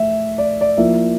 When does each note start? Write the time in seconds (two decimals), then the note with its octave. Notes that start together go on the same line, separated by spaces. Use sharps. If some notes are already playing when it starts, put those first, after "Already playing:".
Already playing: A3 E5
0.38 D5
0.61 D5
0.77 F3 A#3 E4 E5